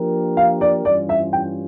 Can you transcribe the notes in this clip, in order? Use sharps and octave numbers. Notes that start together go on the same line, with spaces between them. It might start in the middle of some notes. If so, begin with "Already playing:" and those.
Already playing: F3 A#3 D4 G4 A#4
F5
D5
G2 E3 G3 C#4 F4 D5
E5
G5